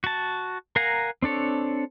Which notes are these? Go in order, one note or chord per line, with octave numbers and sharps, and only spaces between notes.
F#4 A5
A#4 F5 F#5 G#5 A#5
C4 D4 A4 C#5